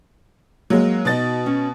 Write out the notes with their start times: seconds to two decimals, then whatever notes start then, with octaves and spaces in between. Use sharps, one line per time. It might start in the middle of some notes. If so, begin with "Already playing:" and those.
0.70 F#3 G#3 A#3
1.05 B2 D#4 F#4 D#5 A6
1.46 C#4